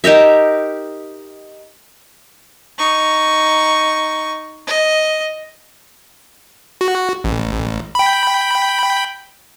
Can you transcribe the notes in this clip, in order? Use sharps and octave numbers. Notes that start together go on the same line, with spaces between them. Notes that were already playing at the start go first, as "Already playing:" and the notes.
D#4 G4 A#4 E5
D#4 C#6
D#5
F#4
A1
G5 B5